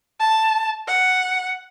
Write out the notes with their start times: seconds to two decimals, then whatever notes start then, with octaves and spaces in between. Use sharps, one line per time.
0.20 A5
0.87 F#5